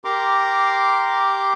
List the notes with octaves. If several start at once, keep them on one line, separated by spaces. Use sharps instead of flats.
G4 A#4 A#5 C6 D6